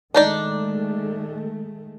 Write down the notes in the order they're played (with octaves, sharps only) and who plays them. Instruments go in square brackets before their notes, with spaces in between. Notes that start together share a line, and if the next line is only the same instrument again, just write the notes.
[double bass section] D#3 G#3 A3 [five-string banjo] D4 D#4 D5